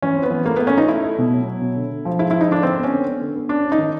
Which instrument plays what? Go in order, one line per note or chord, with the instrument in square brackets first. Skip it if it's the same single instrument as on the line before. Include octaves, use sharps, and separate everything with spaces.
[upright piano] E3 [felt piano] C#4
[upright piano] C4
[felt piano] B3
[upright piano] E3
[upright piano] A3 [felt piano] A#3
[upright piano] A3 [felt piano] B3
[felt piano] C#4
[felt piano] D#4 [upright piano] F4
[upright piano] A3 [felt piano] E4
[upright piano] A3
B2
F#3
F#3
B2
D3
D3
F3
[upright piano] G#3 [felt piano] E4
[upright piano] F3 [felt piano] E4
[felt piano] D#4
[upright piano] D3 [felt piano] D4
[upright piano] D3 [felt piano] C4
[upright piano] B3
[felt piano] C#4
[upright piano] D3
B3
D3
B3
[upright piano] C#4 [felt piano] D4
[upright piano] C#4
[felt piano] D#4
[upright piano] D#3